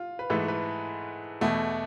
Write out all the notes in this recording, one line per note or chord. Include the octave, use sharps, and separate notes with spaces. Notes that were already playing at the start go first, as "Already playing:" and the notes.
Already playing: F4
B4
G#2 E3 A3 A4
B4
E2 B2 A3